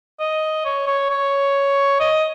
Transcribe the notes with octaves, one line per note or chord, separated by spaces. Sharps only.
D#5
C#5
C#5
C#5
D#5